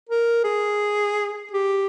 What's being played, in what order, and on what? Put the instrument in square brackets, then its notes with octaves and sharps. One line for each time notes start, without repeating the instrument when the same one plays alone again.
[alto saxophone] A#4
G#4
G4